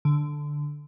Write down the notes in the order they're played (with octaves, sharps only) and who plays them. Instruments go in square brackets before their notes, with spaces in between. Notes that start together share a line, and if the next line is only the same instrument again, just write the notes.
[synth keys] D3